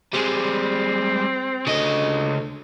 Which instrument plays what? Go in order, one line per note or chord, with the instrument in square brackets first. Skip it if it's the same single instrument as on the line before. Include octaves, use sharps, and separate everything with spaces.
[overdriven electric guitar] G3 G#3 [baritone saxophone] C4
[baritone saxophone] D2 [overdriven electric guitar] C#3 D#5